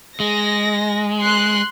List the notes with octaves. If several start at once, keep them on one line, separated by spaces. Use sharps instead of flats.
G#3 A#6
C6 F#6